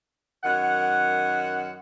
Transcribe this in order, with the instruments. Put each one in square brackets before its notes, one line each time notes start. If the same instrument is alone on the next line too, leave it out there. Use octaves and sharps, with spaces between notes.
[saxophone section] F#2 D#3 F#5